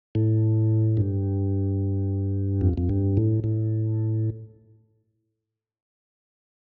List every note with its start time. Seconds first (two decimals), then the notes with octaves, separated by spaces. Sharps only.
0.15 A2
0.97 G2
2.61 F2
2.78 F2
2.89 G2
3.17 A2
3.44 A2